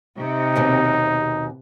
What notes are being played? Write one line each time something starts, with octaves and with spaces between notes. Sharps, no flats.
C3 D#4
D#2 B2 C4